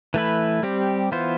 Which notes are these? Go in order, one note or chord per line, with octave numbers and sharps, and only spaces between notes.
E3 A3 E4 B4
G3 C4 G4
E3 B3 F4 C5